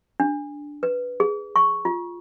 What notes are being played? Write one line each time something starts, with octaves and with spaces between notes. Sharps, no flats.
D4
B4
G#4
C#6
F4